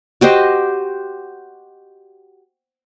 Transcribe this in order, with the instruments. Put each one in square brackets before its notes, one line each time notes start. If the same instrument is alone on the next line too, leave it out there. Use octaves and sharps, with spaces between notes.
[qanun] F#4 G4 C5 D#5